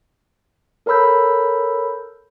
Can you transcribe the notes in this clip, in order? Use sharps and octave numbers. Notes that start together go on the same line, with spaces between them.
A4 A#4 C#5 B5 E6 G6